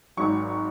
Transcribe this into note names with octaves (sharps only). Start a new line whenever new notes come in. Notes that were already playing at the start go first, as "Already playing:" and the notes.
G#1 G#2 F#3 C#6